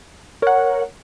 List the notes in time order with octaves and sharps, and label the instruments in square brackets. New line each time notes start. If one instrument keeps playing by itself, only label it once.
[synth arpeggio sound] A#4 F#5 [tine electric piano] C#5